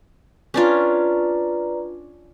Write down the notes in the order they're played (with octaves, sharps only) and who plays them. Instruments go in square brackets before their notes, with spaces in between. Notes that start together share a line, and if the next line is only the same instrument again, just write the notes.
[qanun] C#4 D4 F4 [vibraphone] B4 D5 A#5